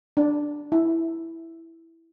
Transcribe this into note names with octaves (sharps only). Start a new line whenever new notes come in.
D4
E4